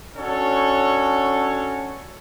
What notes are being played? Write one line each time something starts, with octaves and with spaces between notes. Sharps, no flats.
C#4 D4 F#4 A4 C#5